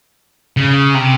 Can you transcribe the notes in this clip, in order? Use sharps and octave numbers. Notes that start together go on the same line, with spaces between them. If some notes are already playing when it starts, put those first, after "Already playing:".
C#3
C3